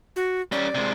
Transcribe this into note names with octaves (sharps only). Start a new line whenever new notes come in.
F#4
G3 C#4 D5
C3 G#3